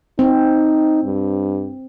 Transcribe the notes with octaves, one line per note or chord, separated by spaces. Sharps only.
C4 D#4
G2